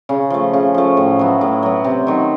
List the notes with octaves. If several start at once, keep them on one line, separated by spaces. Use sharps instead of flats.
C#3
F3 A3
C#3
F3 A3
A2
F#3 B3
A2
F#3 B3
C3
D#3 F#3